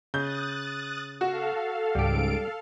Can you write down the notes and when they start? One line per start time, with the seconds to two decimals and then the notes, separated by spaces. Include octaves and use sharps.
0.14 C#3 D#6 F#6 G6 A6
1.21 F#4 A4 F5
1.95 C#2 G#2 G3 G4 D7